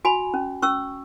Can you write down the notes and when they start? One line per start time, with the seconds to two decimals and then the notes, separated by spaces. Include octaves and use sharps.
0.05 F#4 G#5 B5
0.34 C#4
0.62 C#4 C#6 E6